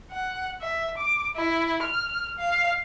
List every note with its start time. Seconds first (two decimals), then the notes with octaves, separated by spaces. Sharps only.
0.11 F#5
0.62 E5
0.97 D6
1.36 E4
1.83 F6
2.38 F5